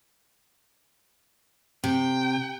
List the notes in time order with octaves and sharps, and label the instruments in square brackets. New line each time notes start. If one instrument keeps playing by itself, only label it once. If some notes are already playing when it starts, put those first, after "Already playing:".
[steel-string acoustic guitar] C3 [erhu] G5